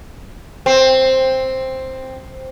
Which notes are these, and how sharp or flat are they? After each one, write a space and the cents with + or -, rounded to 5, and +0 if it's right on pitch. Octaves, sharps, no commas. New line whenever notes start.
C4 +5